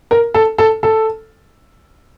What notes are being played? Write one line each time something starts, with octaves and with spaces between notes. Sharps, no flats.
A#4
A4
A4
A4